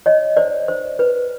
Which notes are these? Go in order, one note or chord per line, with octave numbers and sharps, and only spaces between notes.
C#5 D#5
C5 D5
C5
B4